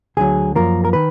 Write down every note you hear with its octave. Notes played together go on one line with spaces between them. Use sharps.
D2 D3 F#3 G#4
F#2 F3 A#3 A#4
A#4
D#3 B4